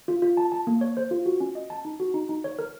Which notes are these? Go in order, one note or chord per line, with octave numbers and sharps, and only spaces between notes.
F4
F4
A5
A5
A#3
C#5
C5
F4
F#4
C#4
D#5
A5
D#4
F#4
D#4
D#4
C#5
A#4